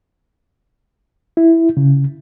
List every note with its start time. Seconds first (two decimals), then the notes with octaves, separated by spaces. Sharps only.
1.37 E4
1.77 C#3